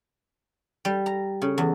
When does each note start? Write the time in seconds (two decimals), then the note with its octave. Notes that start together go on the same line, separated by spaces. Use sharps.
0.85 G3
1.06 A#5
1.42 C#3
1.58 E2